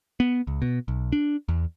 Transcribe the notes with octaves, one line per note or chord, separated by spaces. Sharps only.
B3
C#2
B2
B1
D4
E2